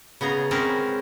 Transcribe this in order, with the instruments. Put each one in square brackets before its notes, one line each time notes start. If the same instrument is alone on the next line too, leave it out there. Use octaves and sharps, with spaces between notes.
[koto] C#3 B3 G#4 A#5
G#3 C4 C#4 G#4 A#4 B4